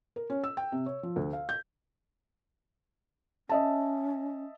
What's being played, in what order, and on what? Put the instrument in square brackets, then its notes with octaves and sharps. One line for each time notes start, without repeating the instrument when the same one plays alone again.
[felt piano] A#4
C#4
E6
G5
C3
C#5
F3
D2
F5
G6
[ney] C#4 [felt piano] D#5 E5 A5